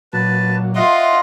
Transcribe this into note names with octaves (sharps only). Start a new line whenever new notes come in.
A#2 F#3 B4 A5
F4 D#5 E5 F#5 C6